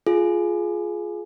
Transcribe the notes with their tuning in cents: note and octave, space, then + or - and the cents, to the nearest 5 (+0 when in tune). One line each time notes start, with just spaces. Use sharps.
F4 +0 G#4 +15